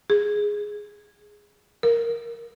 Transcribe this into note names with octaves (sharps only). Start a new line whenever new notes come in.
G#4
A#4